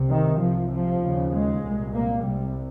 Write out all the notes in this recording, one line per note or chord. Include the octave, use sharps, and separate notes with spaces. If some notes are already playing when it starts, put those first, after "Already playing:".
Already playing: C2 C3
D#3
C2 C3 F3
F3
D#2 C#3
G#3
C2 A#2
A#3
C2 C3 G3